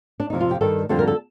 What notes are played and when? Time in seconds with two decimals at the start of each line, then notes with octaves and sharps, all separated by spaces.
0.20 D4
0.30 F2 C3 F3 D#4
0.41 F4
0.51 G4
0.61 G2 D#3 G3 A4
0.89 F2 D3 G3 C5
0.99 A#4
1.07 A4